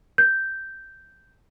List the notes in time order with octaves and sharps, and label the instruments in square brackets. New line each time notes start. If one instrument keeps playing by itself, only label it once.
[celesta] G6